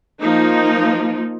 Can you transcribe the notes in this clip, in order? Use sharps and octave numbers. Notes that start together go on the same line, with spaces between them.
F3 A#3 D#4